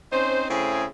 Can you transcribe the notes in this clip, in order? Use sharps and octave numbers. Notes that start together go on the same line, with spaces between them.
C4 C#4 D#4 C5
C#3 A3 C4 E4 G#4